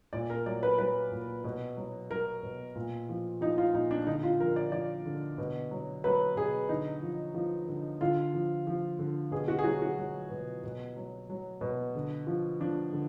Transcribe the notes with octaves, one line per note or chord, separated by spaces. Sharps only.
A#2 D5
A#4
F#3 D5
B4
F#3 B4
A#2
B2
F#3
F#3 A#4
B2
A#2
F3
F3 D#4
F4
A#2 D#4
D4
D3 D#4
F4
F3 A#4
D5
F3 D5
D3
B2
F#3
F#3 B4
B2 G#4
D3 D#4
F3
F3
D3
D3 F4
F3
F3
D3
B2 G#4
F#4
G#4
F#3 F#4
F#4
F#3
B2
B2
F#3
F#3
B2
D3
F3
F3 D4
D3